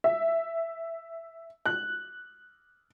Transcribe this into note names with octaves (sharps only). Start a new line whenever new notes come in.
E5
F#6